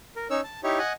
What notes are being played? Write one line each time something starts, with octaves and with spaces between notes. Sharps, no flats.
A#4
C#4 D#4 C#5 E6
A5
D#4 E4 G4 C#5
D#5 F#5 G#5